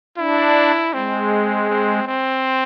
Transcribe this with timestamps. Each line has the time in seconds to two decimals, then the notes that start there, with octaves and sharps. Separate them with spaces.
0.18 D4 E4
0.94 G#3 C4
1.69 C4
2.07 C4